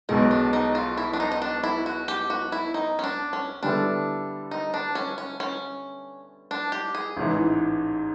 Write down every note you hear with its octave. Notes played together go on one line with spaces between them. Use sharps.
B1 B2 G#3 D#4
D4
D#4
F4
E4
D4
D#4
D#4
D4
E4
F#4
G4
F#4
E4
D#4
C#4
D4
C#4
D3 G3 B3 D4 E4 A4
D#4
D4
C#4
C#4
C#4
D4
G4
G#4
A1 G#2 E3